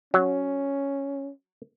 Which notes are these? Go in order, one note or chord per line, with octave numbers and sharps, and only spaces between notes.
F#3 C#4